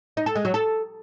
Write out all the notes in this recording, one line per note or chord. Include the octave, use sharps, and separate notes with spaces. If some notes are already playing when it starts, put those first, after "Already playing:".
D#4
A4
G#3
F#3
A4